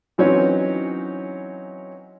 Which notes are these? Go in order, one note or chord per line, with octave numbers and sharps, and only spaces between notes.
E3 F#3 C4 C#4 D#4 C#5